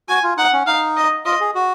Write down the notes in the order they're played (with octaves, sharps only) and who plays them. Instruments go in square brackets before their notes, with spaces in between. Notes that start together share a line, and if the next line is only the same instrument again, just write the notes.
[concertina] F#4 [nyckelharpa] G#5
[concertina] F4
[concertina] D#4 [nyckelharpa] F#5
[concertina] C#4
[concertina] D#4 [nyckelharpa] F5
[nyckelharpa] D#5
[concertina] F4 [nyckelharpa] D#5
[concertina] G#4
F#4